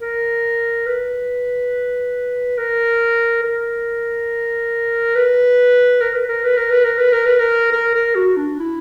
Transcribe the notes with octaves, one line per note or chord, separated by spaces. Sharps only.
A#4
B4
A#4
A#4
B4
A#4
B4
A#4
B4
A#4
B4
A#4
B4
A#4
B4
A#4
A#4
A#4
F#4
D4
E4